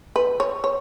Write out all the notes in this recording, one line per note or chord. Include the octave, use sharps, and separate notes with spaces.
B4
C#5
C#5